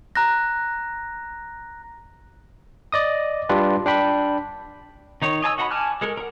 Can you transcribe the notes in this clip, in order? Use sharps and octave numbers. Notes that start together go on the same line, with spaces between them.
A#5 F#6 A#6
D5 D#5 D#6
G3 D4 F4 G4 B4
D4 G5 B5
D#3 D#4 C#5
D#5 G#5 A5 E6
F#4 D#5 F#5 A5 B5
G#5 A5 D6 F6 F#6
G#3 A4 A#4
A#4 F#5